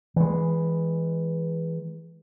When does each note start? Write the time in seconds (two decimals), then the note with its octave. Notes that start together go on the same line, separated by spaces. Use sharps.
0.16 E3 G#3